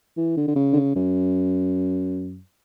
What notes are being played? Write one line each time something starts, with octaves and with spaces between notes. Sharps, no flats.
E3
D3
D3
C#3
D3
C#3
F#2